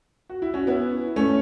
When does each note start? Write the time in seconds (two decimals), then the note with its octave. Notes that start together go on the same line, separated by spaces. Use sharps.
0.30 F#4
0.42 E4
0.54 C#4 F#4
0.67 B3 E4
1.16 A3 C#4